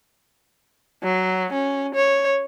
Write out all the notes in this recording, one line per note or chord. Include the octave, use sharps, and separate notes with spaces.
F#3
C#4
C#5